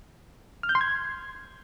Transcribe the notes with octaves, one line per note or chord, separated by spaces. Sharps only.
F6
G6
C6
G#6